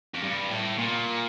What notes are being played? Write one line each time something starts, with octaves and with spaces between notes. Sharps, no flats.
F2
G2
A2
A#2